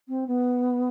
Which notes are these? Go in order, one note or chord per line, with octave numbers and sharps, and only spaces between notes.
C4
B3